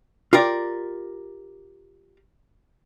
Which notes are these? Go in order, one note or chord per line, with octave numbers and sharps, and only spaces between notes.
F4 G4 A#4 D5